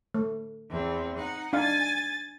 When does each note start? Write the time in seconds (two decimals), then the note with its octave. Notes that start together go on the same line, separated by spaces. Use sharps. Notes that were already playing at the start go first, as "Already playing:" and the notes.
0.14 A3
0.70 E2 C4
1.16 D#4 F#5
1.53 D4 D#4 F5 G#5 A6